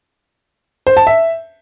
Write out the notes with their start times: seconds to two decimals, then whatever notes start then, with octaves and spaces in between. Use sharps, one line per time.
0.87 C5
0.97 A5
1.07 E5